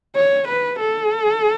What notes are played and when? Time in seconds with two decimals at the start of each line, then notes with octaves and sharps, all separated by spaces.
0.16 C#5
0.48 B4
0.80 A4